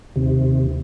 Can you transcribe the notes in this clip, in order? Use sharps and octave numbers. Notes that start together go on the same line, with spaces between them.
D#2 C3